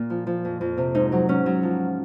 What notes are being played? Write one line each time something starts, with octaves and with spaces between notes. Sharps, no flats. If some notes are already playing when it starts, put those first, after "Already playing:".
Already playing: A#2
F3
F3
F2
F2
C3
G#2 D#4
F#3
G#2 C#4
F#3
F3